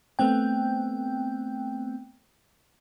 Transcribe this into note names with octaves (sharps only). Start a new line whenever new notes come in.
A3 B3 C4 G5